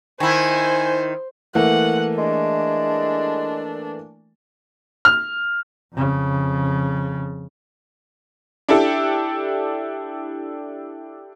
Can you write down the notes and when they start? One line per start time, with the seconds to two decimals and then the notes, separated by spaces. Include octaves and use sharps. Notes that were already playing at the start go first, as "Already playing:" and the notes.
0.20 D#3 E4 C5 G#5
1.55 E3 A3 A#3 F#5
2.17 G#3 D4
5.05 F6
5.93 F2 C#3
8.69 D4 E4 G4 A4